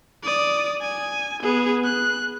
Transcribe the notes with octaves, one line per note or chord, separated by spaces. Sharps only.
D5 D#6
G#5
B3 G#4
F#6